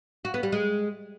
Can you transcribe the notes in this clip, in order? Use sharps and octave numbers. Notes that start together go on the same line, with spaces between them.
F#4
B3
G3
G#3